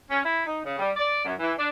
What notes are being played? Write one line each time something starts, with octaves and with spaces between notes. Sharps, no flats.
C#4
E4
D#4
C#3
G3
D5
F#2
E3
D4